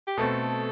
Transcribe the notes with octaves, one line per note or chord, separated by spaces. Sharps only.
G4
B2 A3 C4 A4